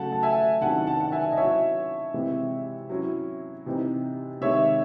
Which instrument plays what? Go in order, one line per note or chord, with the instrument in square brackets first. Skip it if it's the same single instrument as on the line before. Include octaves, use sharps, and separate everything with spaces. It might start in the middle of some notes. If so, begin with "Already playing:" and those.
Already playing: [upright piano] C#3 F#3 A3 F#5 A5
A5
E5 G#5
C3 D#3 F#3 C#4 E4 F#5 A5
F#5 A5
F#5
E5 G#5
D#5
F#3 C#4 E4 C#5 E5
C3 E3 G#3 C4
F#3 C#4 E4
C3 E3 C4 D#4
C3 D#3 G#3 C#5 E5